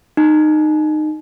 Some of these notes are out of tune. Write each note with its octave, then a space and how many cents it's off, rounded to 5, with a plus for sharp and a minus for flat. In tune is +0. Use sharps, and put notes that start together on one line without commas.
D#4 -20